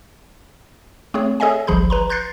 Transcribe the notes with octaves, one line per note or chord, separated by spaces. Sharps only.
A3 C4 G#4 C#5
G#4 A4 C#5 D#5 E5 G#5
G1 C2 F3 G#4 B5 G6
B4 A#5 C6
C6 F#6 G6 A6 C7